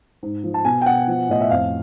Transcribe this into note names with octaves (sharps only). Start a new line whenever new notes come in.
G#2
F3
A5
B2 G#5
G5
B2 F#5
F3
A2 D#5
E5
F2 F5